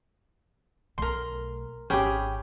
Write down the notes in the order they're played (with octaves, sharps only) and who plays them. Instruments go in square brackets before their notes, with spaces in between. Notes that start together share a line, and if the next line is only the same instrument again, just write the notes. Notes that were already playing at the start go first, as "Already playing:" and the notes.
[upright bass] B1 A3 [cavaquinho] A#4 C6
[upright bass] G#1 [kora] C#4 G4 [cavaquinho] G#4 G5 B5